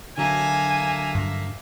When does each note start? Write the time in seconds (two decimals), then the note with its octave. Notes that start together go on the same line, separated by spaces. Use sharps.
0.18 D3 F#3 A#3 E5 G#5
1.15 G2